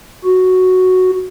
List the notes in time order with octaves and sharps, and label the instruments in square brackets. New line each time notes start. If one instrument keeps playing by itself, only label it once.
[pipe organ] F#4